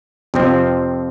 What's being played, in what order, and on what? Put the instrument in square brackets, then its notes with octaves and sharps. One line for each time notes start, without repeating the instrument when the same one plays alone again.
[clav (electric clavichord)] F2 C3 F3 C4